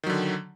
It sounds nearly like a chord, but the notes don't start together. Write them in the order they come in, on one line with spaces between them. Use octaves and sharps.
D#3 F#3 D3